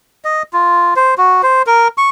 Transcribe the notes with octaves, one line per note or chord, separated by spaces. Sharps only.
D#5
F4
C5
F#4
C5
A#4
C#6